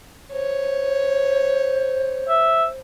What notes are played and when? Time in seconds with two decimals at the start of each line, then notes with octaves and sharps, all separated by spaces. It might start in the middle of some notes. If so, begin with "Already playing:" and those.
0.33 C5 C#5
2.29 E5